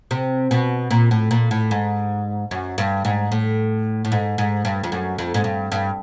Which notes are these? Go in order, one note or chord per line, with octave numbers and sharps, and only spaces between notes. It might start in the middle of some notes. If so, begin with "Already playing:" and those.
C3
B2
A#2
A2
A#2
A2
G#2
F#2
G2
G#2
A2
A2
G#2
G#2
G2
F2
F#2
F2
G#2
G2
G2